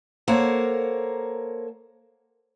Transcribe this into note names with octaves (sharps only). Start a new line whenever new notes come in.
A#3 A4 A#4 C5 C#5 F#5